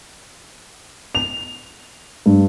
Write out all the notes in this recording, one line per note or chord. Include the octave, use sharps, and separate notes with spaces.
F7
G2